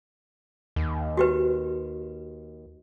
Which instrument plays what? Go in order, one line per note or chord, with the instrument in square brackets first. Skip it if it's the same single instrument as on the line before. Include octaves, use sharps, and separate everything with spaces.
[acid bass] D#2
[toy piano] F#4 G4 B4